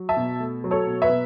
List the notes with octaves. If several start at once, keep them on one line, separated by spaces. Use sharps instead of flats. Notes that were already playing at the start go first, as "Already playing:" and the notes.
Already playing: F#3
E5 A5
B2
A3
F#3
A4 C#5
B2
B4 E5
B2